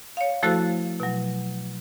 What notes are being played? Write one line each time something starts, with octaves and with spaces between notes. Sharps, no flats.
C#5 F5
F3 A3 E4 F#4 A4 C5
B2 F#3